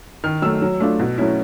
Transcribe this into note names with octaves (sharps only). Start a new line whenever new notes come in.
D#3 F6
F#3 A3 E6
F#3
A3 D4 F4
B2
F#3 A3 C#4 E4